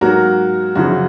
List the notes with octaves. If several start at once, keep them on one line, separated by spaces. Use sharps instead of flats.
G#2 F#3 A#3 F#4 A#4
F#2 C#3 F3 F#4